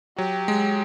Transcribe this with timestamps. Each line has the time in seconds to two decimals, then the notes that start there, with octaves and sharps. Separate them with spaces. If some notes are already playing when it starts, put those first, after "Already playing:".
0.18 F#3 G4
0.48 G#3